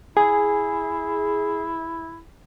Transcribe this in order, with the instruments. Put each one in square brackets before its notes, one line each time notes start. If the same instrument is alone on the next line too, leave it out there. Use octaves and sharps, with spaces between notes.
[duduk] E4 [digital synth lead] G#4 [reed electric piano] G#5